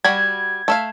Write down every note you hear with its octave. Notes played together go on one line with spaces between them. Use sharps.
G3 F#4 B5 G#6
A3 E5 F5